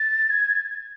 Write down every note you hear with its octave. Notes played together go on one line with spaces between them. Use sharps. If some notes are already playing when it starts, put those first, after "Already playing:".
Already playing: A6
G#6